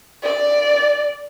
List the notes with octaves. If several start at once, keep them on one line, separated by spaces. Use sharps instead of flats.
D5